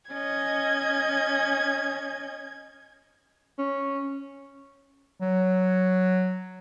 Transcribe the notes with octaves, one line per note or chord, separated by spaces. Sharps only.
C#4 D#5 G#6
C#4
F#3